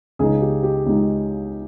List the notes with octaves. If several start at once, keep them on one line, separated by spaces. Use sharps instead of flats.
C#2 C#3 G#3 D#4 G#4
G4
G4
C#2 C#3 G#3 D#4